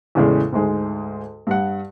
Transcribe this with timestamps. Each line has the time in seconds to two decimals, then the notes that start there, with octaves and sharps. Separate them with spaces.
0.15 E2 A2 C#3 G#3
0.52 D2 G#2 G#3
1.47 G2 F#5